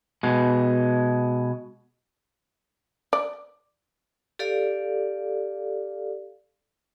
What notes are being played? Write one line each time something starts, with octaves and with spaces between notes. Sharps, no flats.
B2 G#3
D5
G4 A4 D5 F5